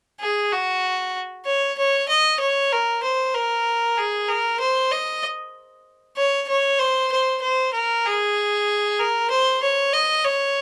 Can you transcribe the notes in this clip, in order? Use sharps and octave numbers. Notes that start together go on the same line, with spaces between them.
G#4
F#4
C#5
C#5
D#5
C#5
A#4
C5
A#4
G#4
A#4
C5
D#5
C#5
C#5
C5
C5
C5
A#4
G#4
A#4
C5
C#5
D#5
C#5